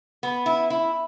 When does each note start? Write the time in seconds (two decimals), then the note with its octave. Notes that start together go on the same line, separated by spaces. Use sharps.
0.23 B3
0.46 E4
0.70 E4